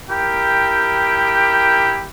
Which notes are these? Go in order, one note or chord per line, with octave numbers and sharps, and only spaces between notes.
E4 G4 A#4 G5